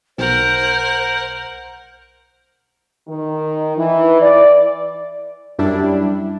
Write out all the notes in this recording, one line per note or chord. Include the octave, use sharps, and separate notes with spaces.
B1 A#4 C5 F#5
D#3
E3
D5
F#2 G3 D4 E4